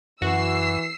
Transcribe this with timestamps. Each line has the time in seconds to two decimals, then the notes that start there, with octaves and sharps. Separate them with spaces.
0.22 F#2 E3 F#4 E6 C7